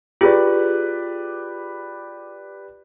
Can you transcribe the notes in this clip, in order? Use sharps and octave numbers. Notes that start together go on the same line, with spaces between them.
F4 G4 G#4 B4 D5